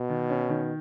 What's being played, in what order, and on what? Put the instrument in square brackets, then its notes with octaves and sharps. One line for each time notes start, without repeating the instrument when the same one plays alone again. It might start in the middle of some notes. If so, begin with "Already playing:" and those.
Already playing: [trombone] B2
[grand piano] D#3
C#4
D#3